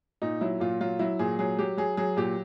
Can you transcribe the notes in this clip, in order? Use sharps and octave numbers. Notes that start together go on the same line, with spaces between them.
A#2 D#4
F#3 E4
A#2 F4
F#3 F4
F#3 E4
A#2 G#4
F#3 G#4
F#3 G4
F#3 G#4
F#3 G#4
A#2 G4